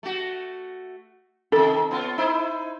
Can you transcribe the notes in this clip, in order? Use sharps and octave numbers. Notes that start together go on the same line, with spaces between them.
A3 F#4
C3 D#3 A4
B3 C#4 F4
D#4 E4 C5